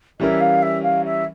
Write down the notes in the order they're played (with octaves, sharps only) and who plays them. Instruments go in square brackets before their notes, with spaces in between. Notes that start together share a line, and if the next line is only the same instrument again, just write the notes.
[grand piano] E3 G3 C#4 E4 A#4 [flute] E5
[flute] F5
E5
F5
E5